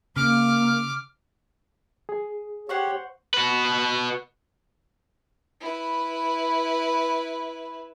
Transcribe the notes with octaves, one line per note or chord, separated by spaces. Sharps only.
C#3 A#3 D6 F6
G#4
G4 C5 C#5 F#5 C#6
F#4 B4
E4 B4